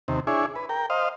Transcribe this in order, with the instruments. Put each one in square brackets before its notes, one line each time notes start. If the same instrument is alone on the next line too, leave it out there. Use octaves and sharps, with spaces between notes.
[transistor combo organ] D#2 C3
D4 E4 G#4 C#5
B4
A#4 G5
C5 D#5 F5